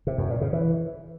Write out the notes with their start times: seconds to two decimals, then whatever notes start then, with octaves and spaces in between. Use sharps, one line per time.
0.07 C3
0.18 F#2
0.30 A#2
0.41 C#3
0.53 E3